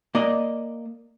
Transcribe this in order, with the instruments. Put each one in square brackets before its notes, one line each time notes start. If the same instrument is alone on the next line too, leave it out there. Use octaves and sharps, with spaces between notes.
[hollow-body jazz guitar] A#3 D5 D#5